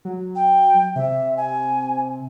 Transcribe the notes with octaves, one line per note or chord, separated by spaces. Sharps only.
F#3
G5
C3 E5
G#5